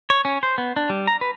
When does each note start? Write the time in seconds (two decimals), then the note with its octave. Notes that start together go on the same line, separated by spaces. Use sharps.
0.10 C#5
0.25 C#4
0.43 C5
0.58 B3
0.76 D4
0.90 G3
1.07 A#5
1.21 B4